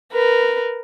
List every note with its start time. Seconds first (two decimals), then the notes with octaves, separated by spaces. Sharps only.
0.12 A#4 B4